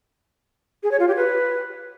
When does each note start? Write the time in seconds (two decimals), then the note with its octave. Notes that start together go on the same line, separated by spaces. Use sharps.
0.83 G#4
0.91 C#5
1.00 F4
1.08 G4
1.16 B4